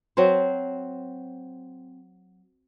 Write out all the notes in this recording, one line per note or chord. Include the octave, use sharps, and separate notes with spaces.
F#3 C4 C5